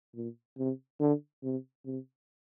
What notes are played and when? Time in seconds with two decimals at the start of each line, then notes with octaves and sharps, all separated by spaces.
0.15 A#2
0.58 C3
1.00 D3
1.43 C3
1.85 C3